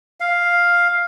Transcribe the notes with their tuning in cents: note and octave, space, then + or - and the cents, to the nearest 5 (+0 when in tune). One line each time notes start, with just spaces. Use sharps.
F5 +5